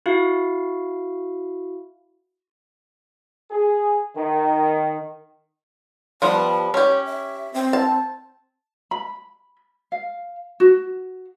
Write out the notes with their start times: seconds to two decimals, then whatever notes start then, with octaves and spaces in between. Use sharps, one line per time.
0.06 E4 F#4 F5
3.51 G#4
4.15 D#3
6.22 F3 G3 B3 A5
6.74 C#4 G4 C#5
7.05 E5
7.54 C4
7.73 A5
8.91 B5
9.92 F5
10.60 F#4